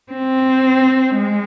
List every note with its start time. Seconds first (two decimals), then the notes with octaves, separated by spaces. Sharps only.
0.12 C4
1.16 G#3